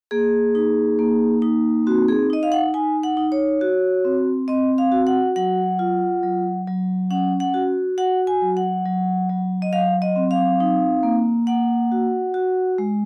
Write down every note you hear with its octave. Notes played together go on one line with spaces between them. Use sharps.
A#3 G#4
D#4
A#3
D#4
C4 F#4
G#4
D#4 D#5
F5
F#5
D#4 G#5
F#5
D#4
C#5
F#4
C4
C4 D#5
F5
F#4
F#5
F#3 F#5
F4
F#3
F#3
C#4 F#5
F#5
F#4
F#4 F#5
G#5
F#3
F#5
F#3
F#3
D#5
F#3 F5
D#5
C4
F5
D#4
A#3
A#3 F#5
F#4
F#4
G#3